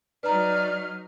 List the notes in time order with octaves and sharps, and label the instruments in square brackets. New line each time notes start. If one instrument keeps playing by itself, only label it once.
[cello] F#3 D#4 [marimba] B4 A#5 [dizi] D5 [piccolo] F6